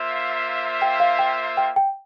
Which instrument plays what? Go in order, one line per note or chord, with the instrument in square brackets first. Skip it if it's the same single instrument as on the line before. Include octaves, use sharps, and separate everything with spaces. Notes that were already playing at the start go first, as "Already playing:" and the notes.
Already playing: [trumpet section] A#3 F4 C5 E5
[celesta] G5
F5
G5
G5
G5